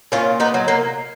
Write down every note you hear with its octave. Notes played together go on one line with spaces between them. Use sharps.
A#2 C#4 F4
B3 D#4
F#3
A#3